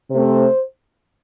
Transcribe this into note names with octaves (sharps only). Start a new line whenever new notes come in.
C3 A3 C4 C5